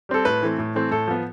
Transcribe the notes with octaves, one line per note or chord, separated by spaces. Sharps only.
G3 C4 A4
A2 B4
E3 A3 C4
A2
E3 A3 C4
A2 A4
F3 B3